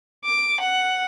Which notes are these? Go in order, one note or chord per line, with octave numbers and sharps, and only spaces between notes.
D6
F#5